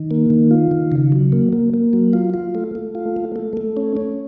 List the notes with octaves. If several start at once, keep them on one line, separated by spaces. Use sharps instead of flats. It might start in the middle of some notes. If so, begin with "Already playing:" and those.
Already playing: D#3
A#3
D#3
F4
D#3
C#3
F#3
A#3
A#3
A#3
F#3
F4
F4
A3
A3
F4
A3
A3
A3
C#4
C#4